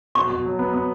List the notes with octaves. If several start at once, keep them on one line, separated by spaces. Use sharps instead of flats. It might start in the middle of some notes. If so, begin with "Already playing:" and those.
B2 C#6
B2
F#3
B3
B3